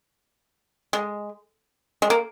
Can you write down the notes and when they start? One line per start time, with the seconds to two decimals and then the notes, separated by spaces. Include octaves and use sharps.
0.93 G#3
2.02 G#3
2.10 A#3